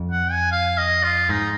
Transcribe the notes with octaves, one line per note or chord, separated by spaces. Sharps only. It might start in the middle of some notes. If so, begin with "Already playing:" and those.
Already playing: F2
F#5
G#5
F5
D#5
F4
G#2 D#4